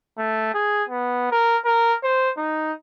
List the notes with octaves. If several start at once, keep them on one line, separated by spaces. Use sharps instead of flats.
A3
G#4
B3
A#4
A#4
C5
D#4